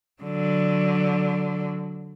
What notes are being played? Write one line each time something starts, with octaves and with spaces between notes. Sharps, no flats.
D3 F#3